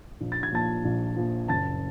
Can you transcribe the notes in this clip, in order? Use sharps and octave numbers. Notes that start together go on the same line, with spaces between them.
A#1
A6
G#6
A#2 F3 A5 A6
A#1
A#2 F3
F#1 A5 A6